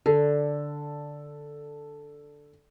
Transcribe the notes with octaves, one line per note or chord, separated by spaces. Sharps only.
D3 A4